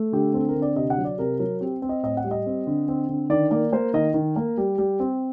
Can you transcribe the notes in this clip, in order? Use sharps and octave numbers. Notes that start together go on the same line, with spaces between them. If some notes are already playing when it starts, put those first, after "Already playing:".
Already playing: A3
D3 G4
C4 A4
A#4
D3
D5
C3 D#5
F#5
F#3
D5
C3 A#4
F#3 A#4
C4 G4
C4
D#5
A2 D#5
F#5
G3
D#5
C4
D3
C4
D3
D#3 D5
A#3 D5
A#3 C5
D#3 D#5
D#3
A#3
G3
G3
C4